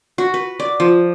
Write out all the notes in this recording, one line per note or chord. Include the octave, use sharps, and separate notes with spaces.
F#4
B4
D5
F3